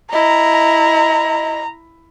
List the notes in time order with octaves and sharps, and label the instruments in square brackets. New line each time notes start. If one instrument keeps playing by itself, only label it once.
[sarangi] E4 [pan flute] D#5 [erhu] A#5